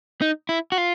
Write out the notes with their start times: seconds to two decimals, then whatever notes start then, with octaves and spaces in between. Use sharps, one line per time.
0.22 D#4
0.49 E4
0.72 F#4
0.78 F4